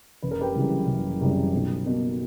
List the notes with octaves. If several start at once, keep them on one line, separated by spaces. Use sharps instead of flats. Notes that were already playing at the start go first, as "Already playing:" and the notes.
F#1 B4
A#4
G4 B4
F#2 C#3 E3 G3
F#1
F#2 C#3 E3 G3
B1
B2 A#3